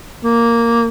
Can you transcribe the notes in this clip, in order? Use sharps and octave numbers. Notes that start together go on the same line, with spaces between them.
A#3